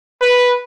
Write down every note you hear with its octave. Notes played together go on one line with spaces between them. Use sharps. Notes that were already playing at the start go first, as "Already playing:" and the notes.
B4